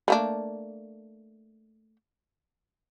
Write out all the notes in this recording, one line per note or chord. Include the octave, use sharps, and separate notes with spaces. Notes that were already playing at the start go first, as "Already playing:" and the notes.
A3 A#3 D4